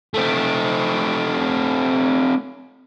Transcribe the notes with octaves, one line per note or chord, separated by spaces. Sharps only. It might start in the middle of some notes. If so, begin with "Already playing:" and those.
A3 C4